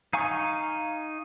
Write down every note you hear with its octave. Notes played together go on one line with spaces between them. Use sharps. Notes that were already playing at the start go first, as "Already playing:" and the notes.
D#4 F5 G#5 C#6